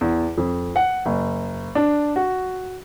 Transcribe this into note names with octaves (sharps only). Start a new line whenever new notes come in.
E2
F2
F#5
F#1
D4
F#4